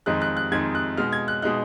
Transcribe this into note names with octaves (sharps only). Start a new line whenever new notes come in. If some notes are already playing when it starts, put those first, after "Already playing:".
F2 D#3 G#3 D#4 F#6
F#6
F#6
F2 D#3 G#3 D#4 G#6
F#6
B2 G#3 D#4 F6
G#6
F#6
B2 G#3 D#4 F#6